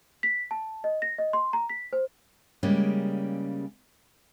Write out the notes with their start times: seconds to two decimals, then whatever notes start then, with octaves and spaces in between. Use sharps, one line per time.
0.23 B6
0.51 A5
0.84 D#5
1.02 A#6
1.18 D#5
1.33 C6
1.53 A#5
1.69 B6
1.93 C5
2.63 C#3 G3 G#3 A#3 C#4